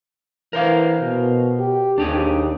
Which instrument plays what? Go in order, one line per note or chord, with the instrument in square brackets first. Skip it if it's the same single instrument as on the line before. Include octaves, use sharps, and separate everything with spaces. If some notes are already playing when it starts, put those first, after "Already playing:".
[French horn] E3 [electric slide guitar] A#4 C5 F5
[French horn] B2
G4
[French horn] D#2 [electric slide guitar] D4 G4 G#4